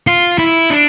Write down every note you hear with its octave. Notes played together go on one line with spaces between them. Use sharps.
F4
E4
D4